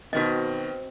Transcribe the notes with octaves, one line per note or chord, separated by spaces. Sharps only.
B2 D#3 B3 C4 F#4 D#5